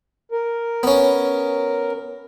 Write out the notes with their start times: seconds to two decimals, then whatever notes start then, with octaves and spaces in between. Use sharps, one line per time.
0.31 A#4
0.83 B3 C#4